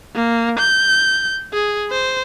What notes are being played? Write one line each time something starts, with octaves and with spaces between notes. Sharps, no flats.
A#3
G6
G#4
C5